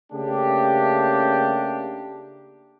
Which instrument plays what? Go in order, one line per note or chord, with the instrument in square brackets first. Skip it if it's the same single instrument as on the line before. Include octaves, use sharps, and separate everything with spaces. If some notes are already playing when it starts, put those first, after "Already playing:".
[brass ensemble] C#3 A3 A#3 D4 G4